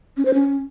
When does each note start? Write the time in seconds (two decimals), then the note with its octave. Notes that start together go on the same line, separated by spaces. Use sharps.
0.17 C#4
0.25 C5
0.34 C#4